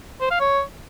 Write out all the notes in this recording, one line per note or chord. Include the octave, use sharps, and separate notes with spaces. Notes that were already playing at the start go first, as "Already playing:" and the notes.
C5
F5
C#5